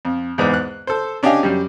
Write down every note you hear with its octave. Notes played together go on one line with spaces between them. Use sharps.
F2
E2 G#2 B4 D6
F#6
A4 C5
C#4 D4 G4 D#5 F5 G#5
F#2 G3